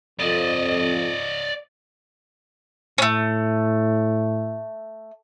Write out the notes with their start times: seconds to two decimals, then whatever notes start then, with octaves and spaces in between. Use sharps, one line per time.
0.19 F2 D5 D#5
2.98 A2 A3 C#4